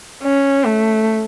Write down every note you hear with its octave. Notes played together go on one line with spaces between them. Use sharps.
C#4
A3